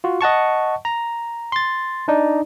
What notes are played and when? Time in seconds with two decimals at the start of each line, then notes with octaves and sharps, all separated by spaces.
0.04 F4 F#4
0.21 D#5 F#5 A5 C#6
0.85 A#5
1.52 C6 A6
2.08 D4 D#4 D5